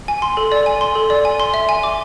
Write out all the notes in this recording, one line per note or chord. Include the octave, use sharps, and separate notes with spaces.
G#5
C6
A4
D5
G#5
C6
A4
D5
G#5
C6
E5
G#5
D6